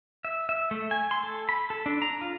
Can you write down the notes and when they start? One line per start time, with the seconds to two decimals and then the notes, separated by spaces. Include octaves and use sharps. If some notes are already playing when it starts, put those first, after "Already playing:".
0.25 E5
0.49 E5
0.71 A3
0.91 G#5
1.11 C6
1.23 A4
1.49 B5
1.70 A4
1.86 D4
2.02 A#5
2.21 F4